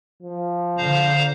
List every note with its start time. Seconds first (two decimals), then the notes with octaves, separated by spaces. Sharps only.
0.23 F3
0.77 D3 C5 F5 A#5